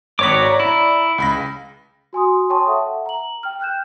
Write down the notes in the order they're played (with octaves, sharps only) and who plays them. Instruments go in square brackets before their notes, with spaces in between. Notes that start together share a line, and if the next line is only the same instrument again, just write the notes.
[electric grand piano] G#1 C#6 B6 [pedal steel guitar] F#4 C#5 D6
[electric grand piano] D5 A#5
[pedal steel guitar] E4
[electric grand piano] C#2 B5 A#6
[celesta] F#4 G#5 C6 D#6
C#5 G5 A5 C6 C#6 D#6
A4 E5 F#5
A#5 F#7
G5 F6
G5 F#6 G6 E7